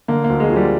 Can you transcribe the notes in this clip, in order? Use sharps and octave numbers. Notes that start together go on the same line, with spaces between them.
D3 A#3
A#3
D2
G#3
D2 F3
G3